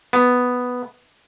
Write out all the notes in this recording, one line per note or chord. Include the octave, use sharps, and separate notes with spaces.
B3